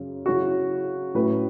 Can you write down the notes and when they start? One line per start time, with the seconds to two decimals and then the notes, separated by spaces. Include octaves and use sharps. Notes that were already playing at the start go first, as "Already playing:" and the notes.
Already playing: F#2 C#3 C#4
0.26 C#3 F#3 C#4 E4 F#4
1.14 A2 F#3 C#4 E4 B4